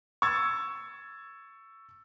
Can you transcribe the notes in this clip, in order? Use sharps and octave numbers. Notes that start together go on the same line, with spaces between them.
C#6 E6 G#6 A6